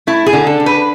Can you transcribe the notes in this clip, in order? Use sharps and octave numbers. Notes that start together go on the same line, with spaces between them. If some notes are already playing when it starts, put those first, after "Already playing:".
A3 E4
G#4
D3
A4
D3
B4